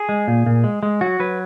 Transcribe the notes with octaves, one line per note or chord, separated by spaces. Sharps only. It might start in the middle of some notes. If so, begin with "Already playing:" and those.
Already playing: G#4
G#3
A#2
A#2
G#3
G#3
F#3 F#4
F#3 B4